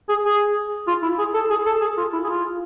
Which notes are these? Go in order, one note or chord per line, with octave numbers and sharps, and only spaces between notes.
G#4
G#4
F4
E4
G#4
A4
G#4
A4
G#4
F4
E4
G#4
F4